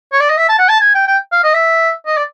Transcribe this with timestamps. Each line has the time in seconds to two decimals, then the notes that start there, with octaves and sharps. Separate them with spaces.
0.12 C#5
0.20 D5
0.29 D#5
0.37 E5
0.49 A5
0.59 F#5
0.69 A5
0.80 G#5
0.94 G5
1.07 G5
1.32 F5
1.43 D#5
1.54 E5
2.06 D#5
2.17 D5